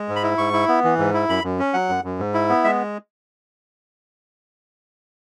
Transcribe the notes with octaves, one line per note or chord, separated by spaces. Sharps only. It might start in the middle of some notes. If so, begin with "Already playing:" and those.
Already playing: G#3
G#2
B5
E4
G#2 C#6
E4
B3
E3
G#2
E4
F#2 B5
F#2
C#4
F#3 F#5
F#2
F#2
G#2
E4
B3
G#3 E5